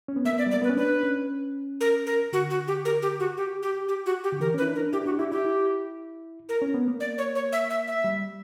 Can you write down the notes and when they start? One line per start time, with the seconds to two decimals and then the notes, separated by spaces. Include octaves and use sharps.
0.08 C#4
0.16 B3
0.25 A#3 E5
0.33 B3
0.38 D5
0.46 G3
0.51 D5
0.54 A#3
0.62 B3 B4
0.69 C#4
0.77 D4 B4
1.03 C#4
1.81 A#4
2.07 A#4
2.33 D3 F#4
2.50 F#4
2.68 G4
2.85 A#4
3.02 G4
3.20 F#4
3.37 G4
3.63 G4
3.88 G4
4.06 F#4
4.24 G4
4.33 D3
4.40 E3 A#4
4.54 C#4 B4
4.62 E4
4.67 D4
4.75 A#4
4.80 D4
4.93 E4 G4
5.06 D4 F#4
5.19 E4 G4
5.32 E4 G4
5.45 E4
6.49 A#4
6.62 C#4
6.74 B3
6.88 A#3
7.00 D5
7.18 C#5
7.35 C#5
7.52 E5
7.70 E5
7.87 E5
8.04 G3